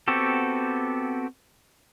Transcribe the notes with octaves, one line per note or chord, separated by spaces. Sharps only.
B3 C4 F#4 G4 A4